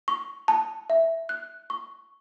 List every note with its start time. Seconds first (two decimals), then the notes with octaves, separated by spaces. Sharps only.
0.08 C#6
0.48 A5
0.90 E5
1.29 F#6
1.70 C#6